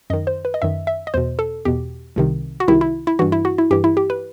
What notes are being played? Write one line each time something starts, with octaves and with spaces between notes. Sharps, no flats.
F#2 D#3 D#5
C5
B4
D#5
F#2 D#3 E5
E5
D#5
E2 B2 C5
A4
E2 B2 G4
C2 C3 D#3
F#4
C2 C3 D#3 E4
E4
E4
G2 E3 F#4
E4
F#4
E4
G2 E3 G4
E4
G4
B4